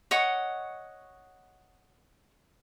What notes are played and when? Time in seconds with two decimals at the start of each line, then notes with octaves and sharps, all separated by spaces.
0.11 C#5 D#5 F#5 C#6